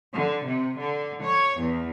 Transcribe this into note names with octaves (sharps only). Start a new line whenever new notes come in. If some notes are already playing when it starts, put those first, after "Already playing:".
D3
C3
D3
C#5
E2